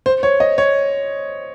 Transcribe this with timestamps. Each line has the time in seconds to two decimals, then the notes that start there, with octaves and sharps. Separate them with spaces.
0.06 C5
0.23 C#5
0.40 D#5
0.58 C#5